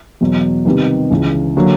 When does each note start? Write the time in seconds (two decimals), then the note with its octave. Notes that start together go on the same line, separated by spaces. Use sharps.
0.21 E2 B2 F#3
0.65 C3 D#3 G3 B3 D#4
1.10 C#2 C#3 E3
1.57 D3 F#3 A#3